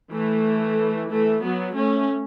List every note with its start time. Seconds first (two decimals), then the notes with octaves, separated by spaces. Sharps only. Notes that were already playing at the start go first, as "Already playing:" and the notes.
0.14 E3 A3
1.11 E3 A3
1.44 F#3 B3
1.77 A3 C#4